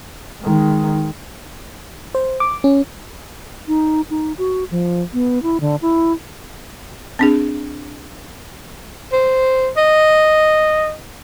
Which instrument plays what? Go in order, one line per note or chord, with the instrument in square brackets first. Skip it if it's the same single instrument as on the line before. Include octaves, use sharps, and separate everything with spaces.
[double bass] D#3 G#3
[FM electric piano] C5
D6
C#4
[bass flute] D#4
D#4
F#4
F3
B3
E4
D3
E4
[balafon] C4 D4 G#4
[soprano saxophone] C5
D#5